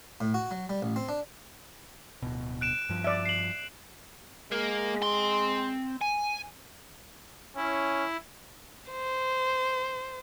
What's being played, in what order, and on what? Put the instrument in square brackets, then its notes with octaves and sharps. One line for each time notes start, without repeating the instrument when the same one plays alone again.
[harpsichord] A2
F#4
F#3
G3
A1
C4
D4
[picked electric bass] D1 B2
[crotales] F#6 D7 E7
[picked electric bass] G2 F3
[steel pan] D5 E5
[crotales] C7 F#7
[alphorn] G#3 [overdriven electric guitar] A#3 A#4
[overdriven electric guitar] C4 C6
G#5
[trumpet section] C#4 [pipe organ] E4
[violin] C5